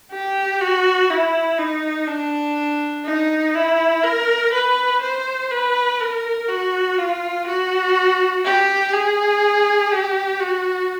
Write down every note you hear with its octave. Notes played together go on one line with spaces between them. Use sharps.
G4
F#4
E4
D#4
D4
D#4
E4
A#4
B4
C5
B4
A#4
F#4
F4
F#4
G4
G#4
G4
F#4